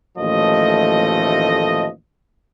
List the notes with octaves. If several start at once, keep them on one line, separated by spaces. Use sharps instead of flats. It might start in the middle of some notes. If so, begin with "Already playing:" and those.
A1 D#2 F3 A3 D#5